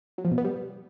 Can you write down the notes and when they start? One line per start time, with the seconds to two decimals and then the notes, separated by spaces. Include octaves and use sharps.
0.18 F#3
0.25 F3
0.31 B2
0.38 B3
0.44 G3